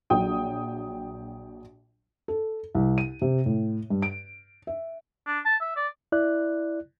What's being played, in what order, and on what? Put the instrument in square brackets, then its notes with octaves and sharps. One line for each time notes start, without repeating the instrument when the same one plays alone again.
[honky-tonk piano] A#1 F#3 G5 D#6
[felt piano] A4
C2
D#7
C3
A2
G2
D7
E5
[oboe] D4
A5
E5
D5
[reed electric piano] E4 D5 F#6